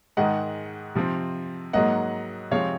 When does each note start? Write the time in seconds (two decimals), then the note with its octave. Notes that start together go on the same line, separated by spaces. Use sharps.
0.17 G#2 D#3 G#3 D#5 F#5
0.95 C3 F3 C4
1.73 G#2 F#3 A#3 D#5 F#5
2.51 C3 F3 G#3 C4 C#5 F5